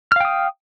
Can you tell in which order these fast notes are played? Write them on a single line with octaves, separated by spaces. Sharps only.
F6 F5 G5 D#6